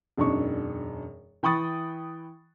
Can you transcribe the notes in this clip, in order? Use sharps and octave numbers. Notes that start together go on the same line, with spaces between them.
E1 F#2 D4 D#4 C#6
E3 G5 B5 C#6 D#6 A6